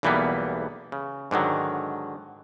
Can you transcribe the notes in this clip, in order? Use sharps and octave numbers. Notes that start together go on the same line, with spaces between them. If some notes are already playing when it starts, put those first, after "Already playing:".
B1 E2 E3 G3 A#3 B3
C#3
G#2 D3 D#3 F#3